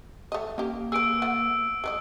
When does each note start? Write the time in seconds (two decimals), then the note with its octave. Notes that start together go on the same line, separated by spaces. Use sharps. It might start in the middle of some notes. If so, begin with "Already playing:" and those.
0.32 A3 D#5
0.58 A#3 C#4 G4
0.92 G#4 B4 E6 D7
1.22 A3 B3 F#4
1.84 G#3 B4 D#5